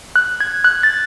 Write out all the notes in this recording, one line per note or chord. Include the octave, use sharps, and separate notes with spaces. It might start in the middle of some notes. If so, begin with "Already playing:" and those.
F#6
G#6
F#6
A6